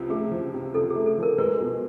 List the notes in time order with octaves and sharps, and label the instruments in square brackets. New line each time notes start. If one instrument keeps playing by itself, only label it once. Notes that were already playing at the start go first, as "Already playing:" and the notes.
Already playing: [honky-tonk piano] C#2 C3 F3
[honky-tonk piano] A3 [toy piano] G#4
[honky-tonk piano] F3
C3
[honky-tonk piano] C#2 [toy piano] A4
[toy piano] G#4
[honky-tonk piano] A3
[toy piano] A4
[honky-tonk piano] F3 [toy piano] A#4
[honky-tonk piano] G#3 [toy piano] B4
[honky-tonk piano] B2